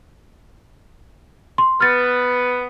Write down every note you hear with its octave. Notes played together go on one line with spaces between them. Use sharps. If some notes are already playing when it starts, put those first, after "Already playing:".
C6
B3 F6 A6